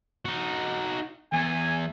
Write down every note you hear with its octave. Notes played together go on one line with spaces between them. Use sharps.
D#4 F#4
E2 G#5